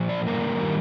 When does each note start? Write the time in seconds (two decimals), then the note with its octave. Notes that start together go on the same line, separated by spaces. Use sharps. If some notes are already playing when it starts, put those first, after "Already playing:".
Already playing: A#2 F3
0.09 D5
0.26 G2 D3 G3 A#3 A#4
0.60 D#3 G3